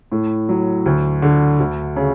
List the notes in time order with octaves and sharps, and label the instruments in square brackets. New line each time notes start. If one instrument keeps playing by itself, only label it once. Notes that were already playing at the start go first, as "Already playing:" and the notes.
[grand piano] A2
F#3
D2
D3
D2
C#3